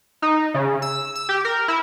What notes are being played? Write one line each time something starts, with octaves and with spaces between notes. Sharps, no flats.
D#4
C#3
E6
E6
G4
A#4
E4